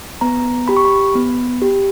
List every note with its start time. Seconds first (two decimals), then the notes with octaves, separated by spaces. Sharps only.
0.21 B3 A#5
0.68 G4 B5
0.77 C#6
0.85 B5
1.15 B3
1.62 G4